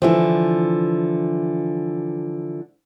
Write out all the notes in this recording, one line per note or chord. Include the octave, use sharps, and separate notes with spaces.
D3 E3 F3